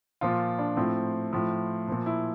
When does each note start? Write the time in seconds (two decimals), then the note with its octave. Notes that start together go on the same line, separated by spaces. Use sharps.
0.21 A#2 F3 F4
0.59 D4
0.77 A2 F3 C4
1.33 A2 F3
1.88 A#2 F3
2.06 E4